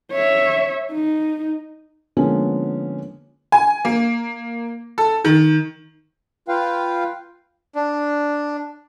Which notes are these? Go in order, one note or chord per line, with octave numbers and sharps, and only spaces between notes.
C#5 E5
D#4
D3 F3 G#3 A#3 B3 C#4
G#5
A#3
A4
D#3
F4 B4 F5 G5
D4